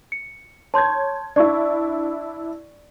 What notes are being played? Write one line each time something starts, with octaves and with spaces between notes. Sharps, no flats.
C#7
C#5 A5 C6 G6 G#6
D4 E4 D5 C#6